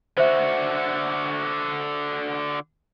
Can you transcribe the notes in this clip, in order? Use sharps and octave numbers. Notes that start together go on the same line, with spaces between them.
D3 F#4 C5 E5